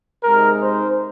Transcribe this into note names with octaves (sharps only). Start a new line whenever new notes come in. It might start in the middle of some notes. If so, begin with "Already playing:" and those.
C3 G#3 D#4 A#4
C5